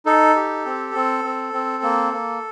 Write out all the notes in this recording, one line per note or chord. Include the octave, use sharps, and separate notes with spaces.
D#4 A4
G4
C4
C4
C4
C4
A#3
A#3